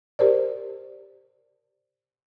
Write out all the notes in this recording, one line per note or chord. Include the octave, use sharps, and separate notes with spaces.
G4 A#4 C5 D5